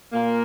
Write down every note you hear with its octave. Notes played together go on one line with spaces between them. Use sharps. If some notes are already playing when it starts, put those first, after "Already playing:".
A#2 A#3